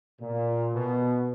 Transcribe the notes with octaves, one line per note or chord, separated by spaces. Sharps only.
A#2
B2